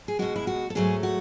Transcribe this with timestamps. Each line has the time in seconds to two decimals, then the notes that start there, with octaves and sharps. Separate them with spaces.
0.08 G#4
0.19 B2 G#3 F#4
0.36 E4
0.47 F#4
0.70 A4
0.75 G#2 F#3 A3 G#4
1.03 F#4